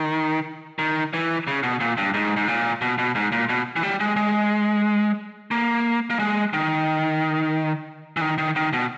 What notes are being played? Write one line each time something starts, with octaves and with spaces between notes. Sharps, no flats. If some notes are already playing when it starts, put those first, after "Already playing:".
Already playing: D#3
D#3
E3
C#3
B2
A#2
G2
G#2
G#2
A#2
B2
B2
G#2
A#2
B2
E3
G3
G#3
G#3
A#3
A#3
G#3
D#3
E3
D#3
D#3
D#3
B2